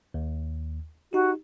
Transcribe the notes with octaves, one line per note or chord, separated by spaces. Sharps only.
D#2
D#4 F#4 G4